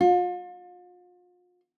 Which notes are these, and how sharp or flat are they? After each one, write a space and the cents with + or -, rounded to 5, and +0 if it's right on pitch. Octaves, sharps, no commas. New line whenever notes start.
F4 +40